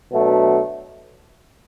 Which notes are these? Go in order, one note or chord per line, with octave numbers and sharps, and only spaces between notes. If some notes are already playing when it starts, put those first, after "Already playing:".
B2 F#3 A3 D4